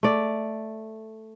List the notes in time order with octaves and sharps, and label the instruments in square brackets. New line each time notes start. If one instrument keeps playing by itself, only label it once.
[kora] A3 D5